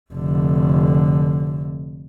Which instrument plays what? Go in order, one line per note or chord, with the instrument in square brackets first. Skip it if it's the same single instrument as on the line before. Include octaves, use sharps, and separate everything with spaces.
[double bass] F1 D3